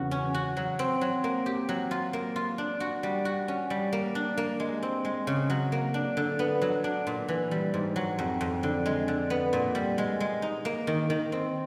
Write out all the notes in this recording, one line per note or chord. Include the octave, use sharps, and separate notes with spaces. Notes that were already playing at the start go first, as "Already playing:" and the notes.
Already playing: E2 C#3 F#4
C#4
F#4
F#3
C4
F#3
A#3
G4
F#3
F4
A#3
F4
D4
F#4
G3
F#4
C#4
G3
A#3
D4
A#3
G#3
C4
G#3
C#3
F#3
A#3
D4
D3
B3
F#3
D4
A#2
E3
G3
G#2
F#3
F2
F2
D3
G#3
D3
B3
A#2
G3
G#3
G#3
D#4
A#3
D#3
D#3
C4